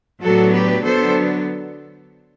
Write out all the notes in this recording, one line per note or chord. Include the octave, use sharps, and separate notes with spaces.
A2 F#3 B3 D4 F#4 A4
G4 B4
D3 F#3 B3 D4 A4 C5